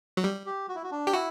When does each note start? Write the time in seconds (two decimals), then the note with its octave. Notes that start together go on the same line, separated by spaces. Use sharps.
0.17 F#3
0.24 G3
0.46 G4
0.69 F#4
0.75 E4
0.83 F#4
0.91 D4
1.07 G4
1.13 E4 F#4